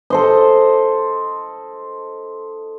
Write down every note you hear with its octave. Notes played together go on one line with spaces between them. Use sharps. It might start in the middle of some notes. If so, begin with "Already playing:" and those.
A4 C5 D#5